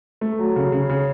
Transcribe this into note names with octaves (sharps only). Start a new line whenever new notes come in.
A3
F#3
C#3
C#3
C#3